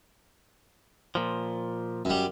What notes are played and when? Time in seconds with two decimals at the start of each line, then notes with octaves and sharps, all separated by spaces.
1.15 A#2 F3
2.05 F#2 G3